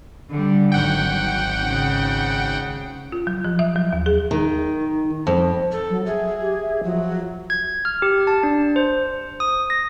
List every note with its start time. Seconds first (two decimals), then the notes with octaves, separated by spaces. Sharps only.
0.30 D3 G3
0.72 G#1 F#3 F#5 G5
1.65 C#3
3.12 F4
3.27 F#3
3.44 F3
3.59 E5
3.76 F#3
3.93 D#2
4.06 G#4
4.31 D#3
5.27 F2
5.72 A4
5.90 F#3
6.06 G#4 E5
6.41 G4
6.61 E5
6.84 F3 F#3
7.50 G#6
7.85 F6
8.02 G4
8.27 A5
8.43 D4
8.76 C5
9.40 D#6
9.70 A#6